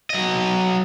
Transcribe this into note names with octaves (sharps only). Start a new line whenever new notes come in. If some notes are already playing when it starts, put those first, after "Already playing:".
F#3 D#5